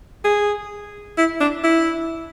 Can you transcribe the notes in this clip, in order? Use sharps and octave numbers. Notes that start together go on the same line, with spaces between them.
G#4
E4
D4
E4